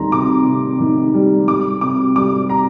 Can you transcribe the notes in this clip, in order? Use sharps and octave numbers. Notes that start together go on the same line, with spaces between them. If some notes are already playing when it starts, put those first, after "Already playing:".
Already playing: D2 C3 D#3 G3 A#5 C6
C3 D6
C3
D#3
G3
G3 D6
C3 D6
G3 D6
A#5